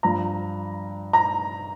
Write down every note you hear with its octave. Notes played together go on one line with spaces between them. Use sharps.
G2 F3 A#5
A#5